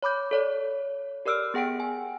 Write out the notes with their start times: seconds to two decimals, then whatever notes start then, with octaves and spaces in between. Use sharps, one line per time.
0.03 C#5 B5 D6 G6
0.31 A4 C#5 D5
1.25 G4 A#4 D5 E6 F6 D7
1.54 B3 G#4 F#5 G5 D7
1.80 G#5